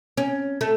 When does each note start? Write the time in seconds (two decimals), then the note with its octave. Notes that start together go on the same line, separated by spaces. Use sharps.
0.17 C#4
0.61 A3